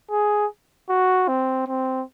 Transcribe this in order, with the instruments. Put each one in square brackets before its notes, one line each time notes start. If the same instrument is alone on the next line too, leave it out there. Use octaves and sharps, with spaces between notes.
[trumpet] G#4
F#4
C4
C4